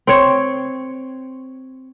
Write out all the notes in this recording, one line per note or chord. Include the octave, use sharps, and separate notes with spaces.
C4 C#5